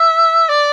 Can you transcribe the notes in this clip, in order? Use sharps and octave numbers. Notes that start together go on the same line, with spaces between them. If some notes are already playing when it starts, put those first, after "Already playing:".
Already playing: E5
D5